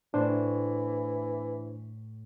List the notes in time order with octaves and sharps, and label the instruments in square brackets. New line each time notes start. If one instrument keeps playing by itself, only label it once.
[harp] A2 [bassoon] E3 [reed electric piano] D4 C5